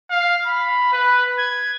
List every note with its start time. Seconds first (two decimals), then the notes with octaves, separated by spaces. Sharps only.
0.10 F5
0.46 B5
0.92 B4
1.39 G#6